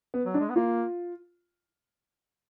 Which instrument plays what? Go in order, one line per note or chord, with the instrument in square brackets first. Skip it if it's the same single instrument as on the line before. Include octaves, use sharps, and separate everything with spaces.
[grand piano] B3
[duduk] F#3
[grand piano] D4
[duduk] G#3
B3
[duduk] A#3 [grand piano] F4